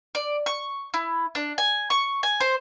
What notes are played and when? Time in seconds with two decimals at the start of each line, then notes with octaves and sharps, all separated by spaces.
0.15 D5
0.46 C#6
0.94 E4
1.35 D4
1.58 G#5
1.90 C#6
2.23 G#5
2.40 C5